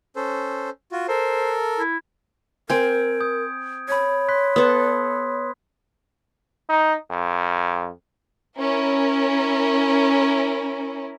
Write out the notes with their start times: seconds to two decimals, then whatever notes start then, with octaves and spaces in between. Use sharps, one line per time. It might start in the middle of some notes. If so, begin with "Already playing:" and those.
0.16 C#4 A4 C5
0.92 F4 F#4
1.08 A4 A#4 C5
1.79 E4
2.70 C4 A#4 G#5 G6 G#6 D7
3.20 D#6 G6
3.89 C#5 B5 G#6
4.28 C6 F#6 B6
4.56 B3 A4 C6 D#6
6.70 D#4
7.10 F2
8.57 C#4 E4 A#4